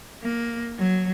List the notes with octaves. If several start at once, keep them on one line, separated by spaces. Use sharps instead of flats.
A#3
F#3